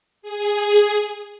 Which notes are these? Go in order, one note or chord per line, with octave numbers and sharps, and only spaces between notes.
G#4